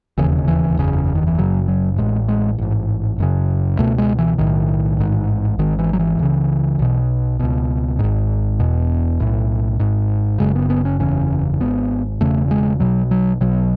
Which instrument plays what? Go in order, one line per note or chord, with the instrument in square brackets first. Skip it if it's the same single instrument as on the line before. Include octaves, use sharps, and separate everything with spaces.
[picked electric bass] E1 D#2 C#3 E3
D#3
E3
F#1 E2 C#3
D#3
E3
F#1 F#2 C#3 F#3
F#3
A1 A2 G#3
G#3
A1 G#2
F#1 F#2 C#3
C#2 B2 A3
G#3
E3
B1 A2 D#3
A1 G#2
G#1 G#2 D#3
E3
F#3
E3
C#2 C#3
B1 B2
C#2 B2
G#1 G#2
E1 E2 B2
B1 A2
G#1 G#2
F#1 F#2 C#3 G#3
B3
B3
C#4
F#1 E2 C#3 C#4
G#1 G#2 B3
E1 E2 C#3 A3
G#3
B1 B2 F#3
F#3
B1 B2 F#3